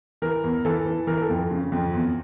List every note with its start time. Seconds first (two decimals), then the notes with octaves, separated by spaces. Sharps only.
0.22 E3 A#4
0.44 E2
0.65 E3 A4
0.86 E3
1.07 E3 A#4
1.17 A#4
1.22 A4
1.30 F2
1.51 C#3
1.72 F2
1.93 E2